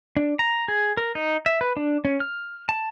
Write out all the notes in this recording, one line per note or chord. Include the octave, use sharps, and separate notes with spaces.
D4
A#5
G#4
A#4
D#4
E5
B4
D4
C#4
F6
A5